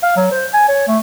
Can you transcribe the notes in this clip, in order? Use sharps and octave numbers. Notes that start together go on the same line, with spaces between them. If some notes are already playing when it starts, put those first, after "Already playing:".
F5
F#3
C5
G#5
C#5
A3